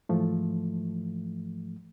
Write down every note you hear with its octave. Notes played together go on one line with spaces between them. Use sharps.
G#2 E3 F3 A3